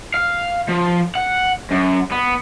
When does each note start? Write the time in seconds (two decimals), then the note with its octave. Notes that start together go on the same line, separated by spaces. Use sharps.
0.14 F5
0.69 F3
1.15 F#5
1.71 F#2
2.12 B3